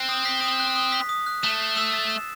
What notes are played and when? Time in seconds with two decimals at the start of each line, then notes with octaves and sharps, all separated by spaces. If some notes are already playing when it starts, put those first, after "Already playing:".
Already playing: C4 F#6
0.09 D#6
0.25 B6
0.42 D#6
0.60 F#6
0.76 D#6
0.92 B6
1.09 D#6
1.26 F#6
1.43 A3 E7
1.59 C7
1.77 E6
1.93 A6
2.10 E7